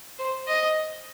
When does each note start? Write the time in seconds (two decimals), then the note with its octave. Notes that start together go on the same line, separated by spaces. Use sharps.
0.19 C5
0.48 D#5